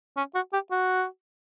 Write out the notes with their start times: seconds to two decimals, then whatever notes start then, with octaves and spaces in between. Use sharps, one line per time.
0.17 C#4
0.35 F#4
0.53 G4
0.71 F#4